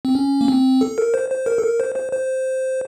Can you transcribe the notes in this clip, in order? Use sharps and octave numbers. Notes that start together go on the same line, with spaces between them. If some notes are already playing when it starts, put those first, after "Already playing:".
C4
C#4
A#3
C4
A4
A#4
C5
C5
A#4
A4
A#4
C5
C5
C5